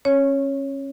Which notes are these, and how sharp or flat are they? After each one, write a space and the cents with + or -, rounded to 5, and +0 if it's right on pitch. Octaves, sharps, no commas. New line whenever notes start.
C#4 -25 C#5 +0